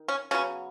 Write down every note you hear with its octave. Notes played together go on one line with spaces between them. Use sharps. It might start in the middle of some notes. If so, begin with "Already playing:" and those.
Already playing: D#3
C#4
C#3 F#3 B3 C#4